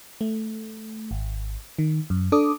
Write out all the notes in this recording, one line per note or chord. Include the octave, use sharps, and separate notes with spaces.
A3
G#1
D#3
F#2
D4 A4 D6 D#6